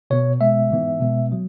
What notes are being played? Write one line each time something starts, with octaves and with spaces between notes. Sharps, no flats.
B2 B3 C#5
B2 G#3 B3 E5
G#2 E3 B3
B2 G#3 B3
F#3